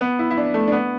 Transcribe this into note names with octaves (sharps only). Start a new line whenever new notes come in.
B3
E4
E4
D4
A3
D4
B3